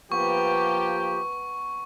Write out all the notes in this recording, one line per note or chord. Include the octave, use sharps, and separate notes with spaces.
F3 A#3 B3 G4 C#6